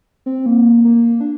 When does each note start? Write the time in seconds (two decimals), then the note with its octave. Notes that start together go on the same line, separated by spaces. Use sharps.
0.26 C4
0.46 A#3
0.85 A#3
1.20 D4